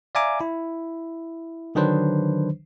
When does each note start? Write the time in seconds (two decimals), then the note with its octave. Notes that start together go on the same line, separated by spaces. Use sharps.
0.15 D5 E5 F5 G#5 A#5 D6
0.41 E4
1.75 D3 D#3 F#3 D4 B4 C5